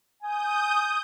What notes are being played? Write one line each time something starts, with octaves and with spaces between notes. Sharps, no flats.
G#5 D#6 G6